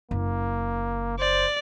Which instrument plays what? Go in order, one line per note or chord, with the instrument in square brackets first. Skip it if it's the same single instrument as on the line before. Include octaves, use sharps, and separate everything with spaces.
[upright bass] F#1 [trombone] A#3
[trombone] C5 [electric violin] D5